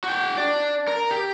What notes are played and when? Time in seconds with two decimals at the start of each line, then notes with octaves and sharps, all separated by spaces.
0.04 F#4 G5
0.38 D4 D5
0.88 A#4
1.11 G4